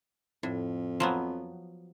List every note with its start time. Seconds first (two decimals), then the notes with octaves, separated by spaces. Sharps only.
0.43 F2 A2
1.00 F3 F#3 B3